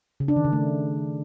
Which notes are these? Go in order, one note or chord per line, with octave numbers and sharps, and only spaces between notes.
C#3
D4
D#3
C#3
A3